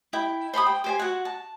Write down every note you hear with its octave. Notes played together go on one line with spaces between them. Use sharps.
E4 G5
C5 B5 C#6 D#6
G5
G4 C5 G#5
F#4 F#5
A5